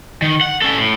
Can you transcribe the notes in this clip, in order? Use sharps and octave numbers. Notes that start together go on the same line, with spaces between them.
D#3
F#5
C#4 A4
A2